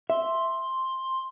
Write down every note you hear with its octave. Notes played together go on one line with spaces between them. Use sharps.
E5 C6